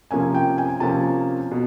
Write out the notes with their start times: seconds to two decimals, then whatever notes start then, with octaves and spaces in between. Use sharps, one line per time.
0.11 C3 F3 A#3 C#4 G#5
0.34 G5
0.58 G#5
0.80 C3 F3 A#3 C#4 A5
1.51 B2